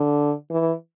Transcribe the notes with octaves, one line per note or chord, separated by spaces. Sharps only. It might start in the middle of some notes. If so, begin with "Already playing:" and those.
Already playing: D3
E3